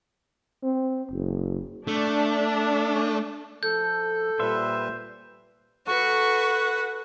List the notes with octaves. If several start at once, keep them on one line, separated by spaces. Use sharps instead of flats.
C4
F#1
A3 D4
F3 A4 G6
A#2 G3 B4 C5 E5
F#4 A4 B4 F#5 C#6